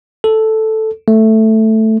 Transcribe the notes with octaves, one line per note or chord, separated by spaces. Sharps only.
A4
A3